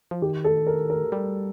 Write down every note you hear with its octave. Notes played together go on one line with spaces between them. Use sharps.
F3
D#3 G4
A4
A#4
A#4
G3